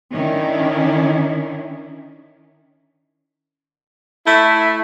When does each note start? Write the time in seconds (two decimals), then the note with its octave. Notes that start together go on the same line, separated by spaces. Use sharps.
0.12 D#3 C#4 D4 E4
4.27 A3 E4